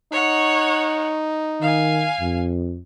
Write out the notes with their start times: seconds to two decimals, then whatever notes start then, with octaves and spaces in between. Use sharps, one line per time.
0.12 D#4 C#5 F#5
1.61 D#3 F5 G#5
2.21 F2